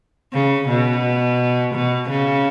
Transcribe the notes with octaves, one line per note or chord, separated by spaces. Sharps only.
C#3
B2
B2
C#3